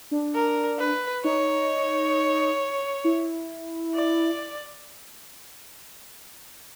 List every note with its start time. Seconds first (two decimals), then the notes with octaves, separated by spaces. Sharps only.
0.11 D4
0.35 A#4
0.79 B4
1.24 D#4 C#5
3.04 E4
3.95 D5